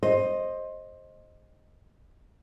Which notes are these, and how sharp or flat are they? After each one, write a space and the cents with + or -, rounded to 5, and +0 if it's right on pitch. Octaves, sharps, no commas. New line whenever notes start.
C5 +15 D#5 +0